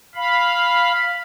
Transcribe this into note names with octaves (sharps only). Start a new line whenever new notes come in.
F5 B5